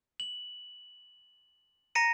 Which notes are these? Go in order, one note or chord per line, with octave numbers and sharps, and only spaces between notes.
F#7
A#5 A#6 C#7 D#7